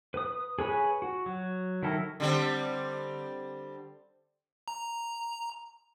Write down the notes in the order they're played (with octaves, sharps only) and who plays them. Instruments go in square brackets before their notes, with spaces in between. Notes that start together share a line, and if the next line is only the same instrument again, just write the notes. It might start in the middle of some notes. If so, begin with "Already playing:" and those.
[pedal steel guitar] B4 D#6
G#4 B4 C#5 G#5
F#4
F#3
D#3 F#3 E4 A4 A#4
[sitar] D3 G3 C4
[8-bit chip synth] A#5